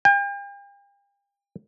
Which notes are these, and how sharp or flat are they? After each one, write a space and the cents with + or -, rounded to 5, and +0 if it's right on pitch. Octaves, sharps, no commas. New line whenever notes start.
G5 +40